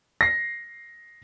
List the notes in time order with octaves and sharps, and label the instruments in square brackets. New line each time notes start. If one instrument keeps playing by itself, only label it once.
[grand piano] A#6 C7